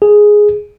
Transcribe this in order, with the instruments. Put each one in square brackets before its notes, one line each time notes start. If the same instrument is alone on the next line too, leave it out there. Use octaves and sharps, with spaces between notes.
[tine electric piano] G#4